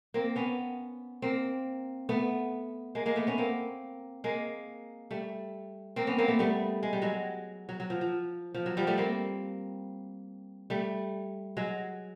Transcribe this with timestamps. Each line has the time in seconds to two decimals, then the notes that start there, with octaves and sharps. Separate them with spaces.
0.14 A#3 C4
0.36 B3 C#4
1.22 A#3 C4
2.09 A3 B3
2.95 G#3 A#3
3.06 G#3 A#3
3.16 A3 B3
3.27 B3 C#4
3.38 A#3 C4
4.24 G#3 A#3
5.11 G3 A3
5.96 A#3 C4
6.07 B3 C#4
6.18 A#3 C4
6.28 A3 B3
6.39 G3 A3
6.83 G#3
6.93 G3
7.02 F#3 G#3
7.69 F#3
7.80 F#3
7.90 F3
8.01 F3
8.54 F3
8.66 F#3
8.77 F3 G3
8.87 G3 A3
8.98 A#3 C4
10.70 G3 A3
11.57 F#3 G#3